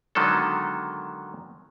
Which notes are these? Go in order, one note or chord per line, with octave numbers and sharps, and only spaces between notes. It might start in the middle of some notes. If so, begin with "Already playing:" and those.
D3 D#3 F#3 G#3 B3 A4